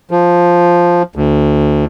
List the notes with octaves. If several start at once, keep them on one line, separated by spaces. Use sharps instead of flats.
F3
D2